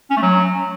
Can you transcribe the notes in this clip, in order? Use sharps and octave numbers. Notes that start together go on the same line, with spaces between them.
C#4
A3
F#3